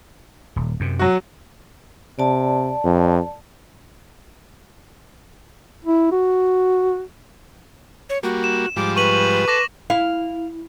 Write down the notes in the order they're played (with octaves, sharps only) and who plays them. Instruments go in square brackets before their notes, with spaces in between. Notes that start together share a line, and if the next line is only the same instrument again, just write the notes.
[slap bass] D#1
F#2 C3
[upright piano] F#3 F#4
[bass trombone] C3 [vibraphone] D5 A5
[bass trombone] F2
[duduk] E4
F#4
[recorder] C#5
[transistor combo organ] G3 A#3 [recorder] F#4
[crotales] E7
[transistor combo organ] G#2 F3 G3 [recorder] D6
[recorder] B4 [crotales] C#6 D#7 F#7
[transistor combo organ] A4 [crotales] D6 A#6 E7
[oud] E4 [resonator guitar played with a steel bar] F5